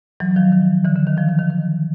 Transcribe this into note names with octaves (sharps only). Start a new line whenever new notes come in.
E3 F#3
D#3 F3
D#3
D3 E3
D3
D#3
D#3 F3
D#3
D#3
D#3